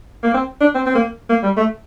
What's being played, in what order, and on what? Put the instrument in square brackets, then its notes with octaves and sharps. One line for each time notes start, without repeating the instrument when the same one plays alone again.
[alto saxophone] A#3
C4
D4
C4
C4
A#3
A#3
G3
A3